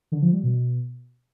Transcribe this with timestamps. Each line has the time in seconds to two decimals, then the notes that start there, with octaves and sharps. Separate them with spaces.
0.12 D3
0.22 F3
0.33 G3
0.44 B2